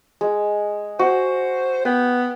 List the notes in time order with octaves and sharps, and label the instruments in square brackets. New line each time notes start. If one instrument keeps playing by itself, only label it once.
[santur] G#3
[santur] F#4 [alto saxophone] C5
[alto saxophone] B3 [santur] G5